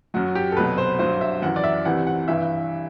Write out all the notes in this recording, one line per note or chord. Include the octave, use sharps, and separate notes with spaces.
F#2 F#3 F#4
G4
A4
C2 B2 F#3 B4
C5
G2 F#3 C5
E5
F#2 E3 F#5
D5
E5
C2 C3 E3 F#5
F#5
G2 E3 E5